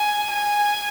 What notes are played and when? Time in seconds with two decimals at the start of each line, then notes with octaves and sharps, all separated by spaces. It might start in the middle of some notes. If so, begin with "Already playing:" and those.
Already playing: G#5
0.30 G#5